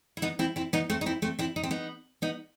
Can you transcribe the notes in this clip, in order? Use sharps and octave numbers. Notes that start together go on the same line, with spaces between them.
E4
B3 D#4
C4 E4
C4 E4
B3 D#4
A3 C4
D#4
C4 E4
A3 C4
C4 E4
D#4
C4
B3 D#4
B3 D#4